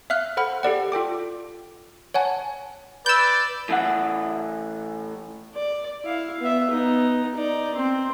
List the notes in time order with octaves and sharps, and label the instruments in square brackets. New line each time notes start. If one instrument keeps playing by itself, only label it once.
[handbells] E5 F5 F6 F#6
A4 C5 F#5 B5 F6
G4 A4 D5 F#5
F4 A4 G5 D6
C#5 F#5 G#5 A5
[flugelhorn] B4 [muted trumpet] D5 [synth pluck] E6 G6
[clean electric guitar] A2 E3 F#5
[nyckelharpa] D5
E4 F5
B3 E5
B3 D#4
D#4 D5
C4